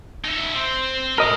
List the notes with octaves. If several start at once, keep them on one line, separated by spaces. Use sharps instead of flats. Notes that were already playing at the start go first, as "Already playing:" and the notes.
D#4 E5
C4
A4 A#4 D#5 B5